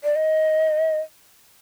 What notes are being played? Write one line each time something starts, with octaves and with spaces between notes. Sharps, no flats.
D5
D#5